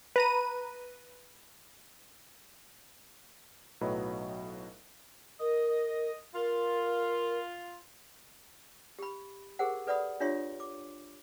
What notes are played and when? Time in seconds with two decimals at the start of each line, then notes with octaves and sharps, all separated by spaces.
0.16 B4 A#5 D#7
3.81 B1 A2 F#3 B4 D#5 B5
5.40 A#4 D#5
6.35 F4 A#4
8.99 G4 B5
9.59 G4 G#4 A#4 C5 F#5
9.87 A4 B4 D5 F#5 B5 D#6
10.20 D4 F4 G4 C#5 E5 C6
10.60 D6